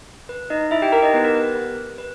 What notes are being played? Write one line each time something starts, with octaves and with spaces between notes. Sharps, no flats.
B4
D#4 D#5
E4 E5
G4 G5
A#4 A#5
D#4 D#5
B3 G4 B4
A#4
B4
B4
B4
B4